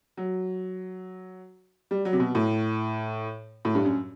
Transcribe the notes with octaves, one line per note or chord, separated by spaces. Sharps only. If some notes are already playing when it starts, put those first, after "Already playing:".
F#3
G3
F#3
C3
B2
A2
A2
G2
F#2